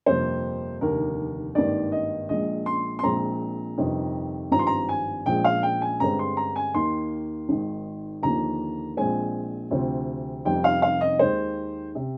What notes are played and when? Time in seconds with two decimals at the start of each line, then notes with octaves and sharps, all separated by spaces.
0.06 G1 F2 C3 F3 A#3 C5
0.81 F1 D#2 D3 A#4
1.55 G#1 G2 D#3 A#3 D5
1.92 D#5
2.29 A#1 A#2 G#3 D#5
2.66 C6
2.99 C6
3.03 A#1 A#2 G#3 C4 A#5
3.78 G1 F2 C3 D#3
4.51 G#1 G2 F3 C4 A#5
4.59 C6
4.67 A#5
4.89 G#5
5.26 A#1 A#2 F3 G#3 G5
5.44 F5
5.63 G5
5.82 G#5
6.00 G2 D3 G#3 C4 A#5
6.19 C6
6.37 A#5
6.56 G#5
6.74 D#2 D#3 A#3 C6
7.49 G#1 G#2 D#3
8.23 D#2 D3 F3 A#3 A#5
8.97 A#1 A#2 G#3 C4 G#5
9.71 D2 C3 F3 C4
10.45 F1 F2 C3 D#3 G3 G5
10.64 F5
10.82 F5
11.01 D#5
11.19 D#2 D#3 G#3 C5
11.95 C3